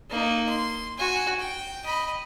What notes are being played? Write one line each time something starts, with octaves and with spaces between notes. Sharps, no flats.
A#3 D#4
C6
F#4 G#5
G5
D#5 B5